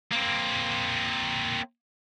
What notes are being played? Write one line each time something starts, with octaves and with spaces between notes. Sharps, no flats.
A#3 C4